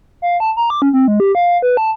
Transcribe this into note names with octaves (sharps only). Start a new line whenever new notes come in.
F5
A5
A#5
D6
C#4
C4
G#3
G4
F5
B4
A5